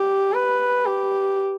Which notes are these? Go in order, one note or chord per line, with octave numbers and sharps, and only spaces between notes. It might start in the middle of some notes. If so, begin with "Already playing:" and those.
Already playing: G4
B4
G4